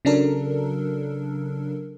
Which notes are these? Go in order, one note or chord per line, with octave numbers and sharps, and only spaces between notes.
C#3 F#3 D4 A4 A#4